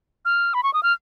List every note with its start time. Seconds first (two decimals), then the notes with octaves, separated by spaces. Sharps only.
0.25 F6
0.54 B5
0.63 C#6
0.74 D#6
0.83 F6